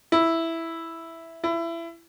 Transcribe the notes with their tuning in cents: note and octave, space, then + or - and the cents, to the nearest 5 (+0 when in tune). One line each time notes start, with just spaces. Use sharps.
E4 +0
E4 +25